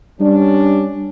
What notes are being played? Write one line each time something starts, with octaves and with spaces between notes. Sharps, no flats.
G3 C#4 D4